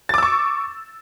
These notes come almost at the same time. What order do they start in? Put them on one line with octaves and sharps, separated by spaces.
A6 D6 E6 C#6